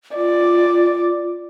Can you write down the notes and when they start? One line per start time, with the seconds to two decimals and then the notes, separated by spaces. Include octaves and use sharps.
0.16 F4 D5